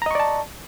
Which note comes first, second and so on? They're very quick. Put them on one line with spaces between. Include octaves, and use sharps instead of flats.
A#5 D#5 C#6 D5 A5